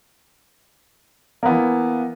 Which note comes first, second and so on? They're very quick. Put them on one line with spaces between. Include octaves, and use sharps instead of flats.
A#3 B3 E3